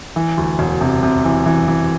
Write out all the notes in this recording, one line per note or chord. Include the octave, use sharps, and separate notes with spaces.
E3
D2
E1
C3
C3
E3
E3
E3